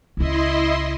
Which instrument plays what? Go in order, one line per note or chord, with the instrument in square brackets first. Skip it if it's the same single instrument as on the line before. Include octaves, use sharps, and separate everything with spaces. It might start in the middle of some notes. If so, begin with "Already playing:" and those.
[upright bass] C#2 C#3 [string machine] E4 D#5 C6